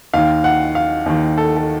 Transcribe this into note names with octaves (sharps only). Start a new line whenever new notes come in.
D#2 D#3 F5
F#5
F5
D#2 D#3
A4
A4